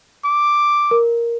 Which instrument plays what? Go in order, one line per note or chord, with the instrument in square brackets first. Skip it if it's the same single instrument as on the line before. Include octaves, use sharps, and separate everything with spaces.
[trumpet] D6
[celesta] A#4